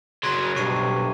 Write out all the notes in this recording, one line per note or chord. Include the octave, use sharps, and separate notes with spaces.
C#3 F#3 C6 G#6 A#6
B1 G2 C3 C#6 C7 D#7